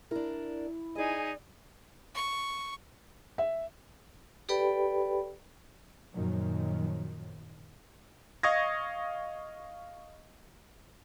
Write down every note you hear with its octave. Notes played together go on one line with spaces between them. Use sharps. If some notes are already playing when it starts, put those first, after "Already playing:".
D4 E4 A#4
D#4 G#4 D5 D#5 G#5
C#6
E5
G4 A4 B4 D5 G5 B5
F#2 A#2 D#3 F3 F#3
D#5 F5 C#6 D#6 G#6 A#6